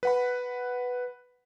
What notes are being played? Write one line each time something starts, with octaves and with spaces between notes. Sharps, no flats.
B4 F#5 B5